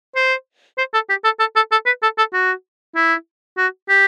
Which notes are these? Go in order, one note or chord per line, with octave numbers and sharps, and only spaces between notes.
C5
C5
A4
G4
A4
A4
A4
A4
B4
A4
A4
F#4
E4
F#4
G4